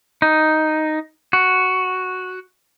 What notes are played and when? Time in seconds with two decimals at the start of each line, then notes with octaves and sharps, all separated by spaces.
0.22 D#4
1.33 F#4